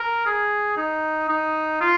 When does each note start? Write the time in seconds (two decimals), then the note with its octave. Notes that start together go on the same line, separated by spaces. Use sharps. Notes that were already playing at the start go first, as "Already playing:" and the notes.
Already playing: A#4
0.26 G#4
0.77 D#4
1.29 D#4
1.81 F4